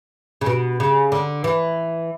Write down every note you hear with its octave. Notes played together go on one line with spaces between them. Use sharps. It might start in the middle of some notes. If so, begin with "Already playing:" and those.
C#3
B2
C#3
D3
E3